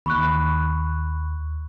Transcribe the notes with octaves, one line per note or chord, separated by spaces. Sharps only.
D#2 B5 C#6 F#6